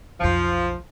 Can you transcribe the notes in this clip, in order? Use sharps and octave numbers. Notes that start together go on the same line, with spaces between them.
B1 F2 F3